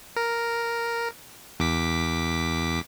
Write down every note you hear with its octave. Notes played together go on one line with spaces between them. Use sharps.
A#4
E2 D6 B6